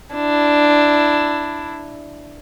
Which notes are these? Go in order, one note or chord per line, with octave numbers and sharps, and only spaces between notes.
D4 E4